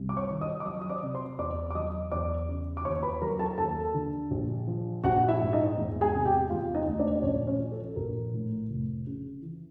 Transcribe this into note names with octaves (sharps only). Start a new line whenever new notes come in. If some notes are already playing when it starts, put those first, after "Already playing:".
Already playing: C2
D6
C#5 C#6
D#3
D#5 D#6
D6
F#3 D#5 D#6
D#6
D5 D6
C3
C5 C6
E2 D5 D6
D6
F#3 D#5 D#6
E2 D5 D6
C#3
D6
D#2 C#5 C#6
B4 B5
F#3 A#4 A#5
A4 A5
D#2 A4 A5
D3
A#1
F3
A#1 F#4 F#5
E4 E5
G#2
D#4 D#5
E1
G#4 G#5
C3
G4 G5
E1 F4 F5
D#4 D#5
D2
D4 D5
D5
A#1 C#4 C#5
C#4 C#5
F3
A4
A#1 A#4
A2
F1
C#3
E3